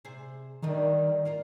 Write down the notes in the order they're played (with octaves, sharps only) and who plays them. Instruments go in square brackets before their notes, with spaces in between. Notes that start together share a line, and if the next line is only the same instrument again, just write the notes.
[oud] C3 G#4 C5
[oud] D3 G3 D4 [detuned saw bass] D#3
[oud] A#3 F4 A#4